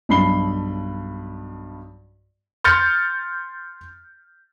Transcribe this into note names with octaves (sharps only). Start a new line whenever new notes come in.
B1 G2 B5 C7 G7
C6 F6 G6 A6 C#7